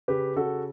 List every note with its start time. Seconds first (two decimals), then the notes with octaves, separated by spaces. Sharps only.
0.08 C#3 G4 B4
0.36 C#3 F#4 A4